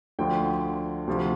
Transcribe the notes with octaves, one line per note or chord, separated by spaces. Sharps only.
D2 D3 F3 G5
D2 C3 F3